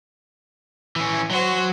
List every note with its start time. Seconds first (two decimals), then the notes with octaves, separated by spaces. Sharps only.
0.96 E3 C#4
1.31 F#3 F#4 C5